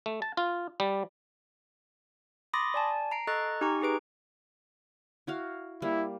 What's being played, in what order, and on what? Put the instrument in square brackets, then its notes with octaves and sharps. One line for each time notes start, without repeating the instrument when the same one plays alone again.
[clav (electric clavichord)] A3
A5
F4
G3
[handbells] B5 C6 D6 D#6 A6 A#6
D5 G#5 A5
A#5 C7 D7
A4 D#5 A#5 C#6 F#6 A6
D#4 G4 G#5 A#5 C#6
D#4 G4 G#4 B4 D7
[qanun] E4 F#4 F5
[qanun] G3 A#3 [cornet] E4